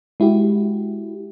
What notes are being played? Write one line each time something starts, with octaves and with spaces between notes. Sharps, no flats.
G#3 E4 F#4 G4